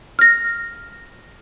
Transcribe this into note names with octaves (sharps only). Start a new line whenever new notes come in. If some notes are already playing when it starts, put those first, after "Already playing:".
F6 A#6